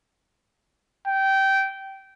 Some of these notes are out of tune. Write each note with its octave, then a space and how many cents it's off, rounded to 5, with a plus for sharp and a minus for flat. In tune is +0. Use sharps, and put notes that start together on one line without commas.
G5 -15